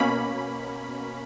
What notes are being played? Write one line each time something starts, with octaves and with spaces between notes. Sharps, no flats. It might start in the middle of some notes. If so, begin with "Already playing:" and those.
Already playing: B2 A#3 C#4 B5